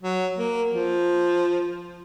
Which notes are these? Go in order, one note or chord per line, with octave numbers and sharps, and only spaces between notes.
F#3
A#3
F3